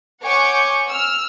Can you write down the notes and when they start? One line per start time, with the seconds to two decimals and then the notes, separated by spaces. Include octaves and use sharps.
0.24 C#5 F#5 G#5 C#6 D6 G6
0.89 E6 F6